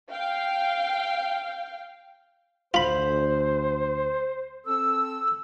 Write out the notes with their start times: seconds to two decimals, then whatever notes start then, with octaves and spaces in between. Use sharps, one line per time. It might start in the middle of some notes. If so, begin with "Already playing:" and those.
0.10 F5 G5
2.74 D2 F4 C5 B5
4.66 C4 A4 E6